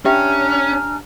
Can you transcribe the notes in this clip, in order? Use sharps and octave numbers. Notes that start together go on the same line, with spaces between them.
C#4 D4 G4 E5 G5 G#5 A#5 F6